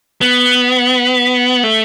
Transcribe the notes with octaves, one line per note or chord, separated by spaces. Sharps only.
B3
A3